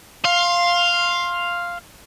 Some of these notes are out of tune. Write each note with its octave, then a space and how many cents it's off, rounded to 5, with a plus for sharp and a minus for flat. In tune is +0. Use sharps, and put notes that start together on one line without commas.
F5 +0 C6 +20